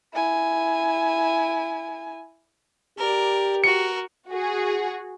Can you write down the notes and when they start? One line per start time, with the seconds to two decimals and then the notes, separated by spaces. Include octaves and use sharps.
0.14 E4 G#5
2.98 G4 A#4 D5
3.64 F#4 A#4 C#7
4.29 F#4 G#4